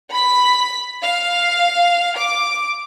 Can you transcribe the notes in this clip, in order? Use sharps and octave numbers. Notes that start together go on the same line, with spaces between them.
B5 B6
F5
D6